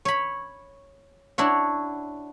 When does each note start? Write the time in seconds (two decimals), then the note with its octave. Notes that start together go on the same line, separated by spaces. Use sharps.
0.05 C#5 B5
1.38 D4 E4 F#4 C#5